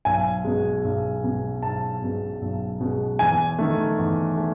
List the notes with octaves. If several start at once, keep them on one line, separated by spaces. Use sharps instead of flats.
B1 G#5
B2 G#3
B1
B2 G#3
B1 A5
B2 G#3
B1
B2 G#3
E2 G#5
D#3 A3
E2
A3